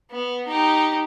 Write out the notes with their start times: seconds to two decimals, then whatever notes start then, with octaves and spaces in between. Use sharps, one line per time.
0.11 B3
0.47 D#4 G4